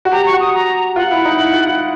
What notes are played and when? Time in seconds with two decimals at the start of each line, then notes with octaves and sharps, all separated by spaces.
0.05 F#4
0.12 G4 A#5
0.26 C#6
0.33 F#4
0.40 D#6
0.54 A#5
0.96 F4 F#5
1.11 E4
1.25 D#4
1.39 E4
1.53 F4
1.66 E4